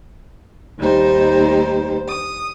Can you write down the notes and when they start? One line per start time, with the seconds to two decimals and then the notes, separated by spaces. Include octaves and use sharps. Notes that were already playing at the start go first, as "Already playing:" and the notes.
0.78 D#2 G3 D#4 C5
2.08 D#6